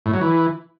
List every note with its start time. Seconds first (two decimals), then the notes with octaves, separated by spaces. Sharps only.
0.06 A2
0.14 F#3
0.21 E3